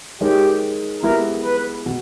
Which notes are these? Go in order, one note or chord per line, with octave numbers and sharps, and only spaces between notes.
G#3 D#4 G4 A#4 C#5
G#3 B3 E4 G4 A#4
B4
B2